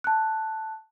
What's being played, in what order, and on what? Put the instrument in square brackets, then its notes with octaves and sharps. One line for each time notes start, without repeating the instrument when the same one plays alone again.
[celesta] A5 F#6